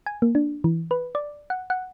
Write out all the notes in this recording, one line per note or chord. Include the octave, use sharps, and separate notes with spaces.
G#5
A#3
D4
E3
B4
D5
F#5
F#5